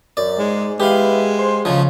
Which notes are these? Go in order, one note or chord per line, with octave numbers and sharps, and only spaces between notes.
F#2 D5
G#2 G#3
G#3 B3 E4 G4 B4 F5
C5 C6
D2 C#3 F3 G#3 C#4